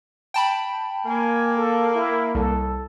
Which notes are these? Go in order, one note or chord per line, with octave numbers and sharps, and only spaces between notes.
G5 A5 B5
A#3 G#5
A4
E4
C2 A4